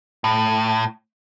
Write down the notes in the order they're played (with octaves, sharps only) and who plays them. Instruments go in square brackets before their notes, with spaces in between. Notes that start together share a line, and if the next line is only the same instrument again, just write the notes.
[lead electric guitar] A2